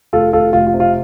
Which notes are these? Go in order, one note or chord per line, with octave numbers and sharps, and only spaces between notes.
F1 F4 A4
F1 F4 A4
F1 F4
F4
C3
F4